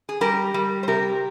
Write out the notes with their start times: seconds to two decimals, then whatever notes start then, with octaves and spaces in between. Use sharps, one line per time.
0.09 G#4
0.21 G3 G4 A#4
0.54 G3
0.83 C5
0.88 C3 G4 A#4